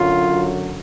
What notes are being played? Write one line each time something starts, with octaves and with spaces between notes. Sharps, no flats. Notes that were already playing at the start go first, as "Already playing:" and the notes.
Already playing: F#2 D3 F#3 F4